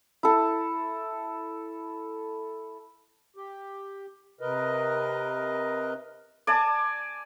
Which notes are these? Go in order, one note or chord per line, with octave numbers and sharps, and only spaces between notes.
E4 A4
G4
C3 A#4 B4 D#5
D5 G#5 A5